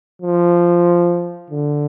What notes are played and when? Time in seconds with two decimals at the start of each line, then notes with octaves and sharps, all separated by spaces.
0.22 F3
1.50 D3